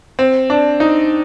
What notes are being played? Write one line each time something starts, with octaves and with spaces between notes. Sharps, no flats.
C4
D4
D#4